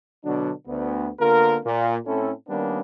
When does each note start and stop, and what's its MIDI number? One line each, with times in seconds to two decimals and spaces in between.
0.25 0.51 47
0.25 0.51 50
0.25 0.51 54
0.25 0.51 62
0.67 1.09 38
0.67 1.09 59
1.20 1.58 50
1.20 1.58 58
1.20 1.58 59
1.20 1.58 65
1.20 1.58 70
1.65 1.97 46
1.65 1.97 58
2.06 2.32 45
2.06 2.32 60
2.06 2.32 61
2.06 2.32 64
2.06 2.32 69
2.48 2.81 51
2.48 2.81 55
2.48 2.81 58
2.48 2.81 59
2.48 2.81 61
2.48 2.81 62